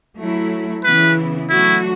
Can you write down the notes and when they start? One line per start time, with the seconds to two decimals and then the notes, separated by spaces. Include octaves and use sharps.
0.19 F#3 A3 E4
0.84 C#3 E3 B3 E4 B4
1.49 F#3 A3 D4 E4 F#4